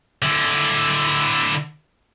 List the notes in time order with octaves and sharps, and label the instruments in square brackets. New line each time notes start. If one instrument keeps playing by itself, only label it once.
[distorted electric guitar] D3 E4